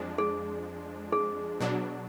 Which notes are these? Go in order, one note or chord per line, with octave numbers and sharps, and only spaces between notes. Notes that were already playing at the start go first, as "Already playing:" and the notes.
Already playing: F2 F3 G#3 D4
G#4
G#4
B2 F#3 D4